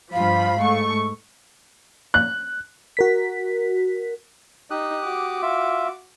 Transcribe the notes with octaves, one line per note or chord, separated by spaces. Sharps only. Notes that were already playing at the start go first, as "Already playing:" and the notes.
G2 F3 F5 B5
G#2 A3 C#6
F#6
F#4 A#4 B6
D#4 G4 D#6 F#6
F#4 D6
F4 E5